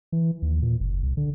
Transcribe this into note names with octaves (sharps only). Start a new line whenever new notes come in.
E3
D#2
A#2
F#1
C2
D3